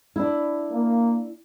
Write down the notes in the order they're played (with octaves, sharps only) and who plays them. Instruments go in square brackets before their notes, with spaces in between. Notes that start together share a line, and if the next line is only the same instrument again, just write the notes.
[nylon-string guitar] D4 E4
[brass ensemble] A#3